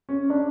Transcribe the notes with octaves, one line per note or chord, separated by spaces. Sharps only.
C#4
D4